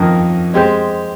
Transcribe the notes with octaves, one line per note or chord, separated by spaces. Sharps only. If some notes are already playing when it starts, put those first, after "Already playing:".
Already playing: F2 D#3 A#3
G#3 C4 G4 C5